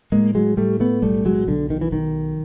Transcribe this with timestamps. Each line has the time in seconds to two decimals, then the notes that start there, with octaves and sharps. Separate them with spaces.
0.12 A2 G#3 A#3
0.35 F#3 G#3
0.57 A2 G3 A3
0.80 A3 B3
1.02 B1 G3 A3
1.25 F#3 G#3
1.47 B1 D3
1.70 D#3
1.81 E3
1.92 B1 D#3